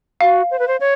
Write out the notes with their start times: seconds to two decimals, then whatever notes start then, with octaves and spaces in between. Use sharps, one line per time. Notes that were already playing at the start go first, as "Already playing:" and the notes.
0.21 F#4 F5
0.51 C5
0.59 B4
0.68 C5
0.80 C#5